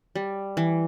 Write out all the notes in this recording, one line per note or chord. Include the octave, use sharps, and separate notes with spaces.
G3
E3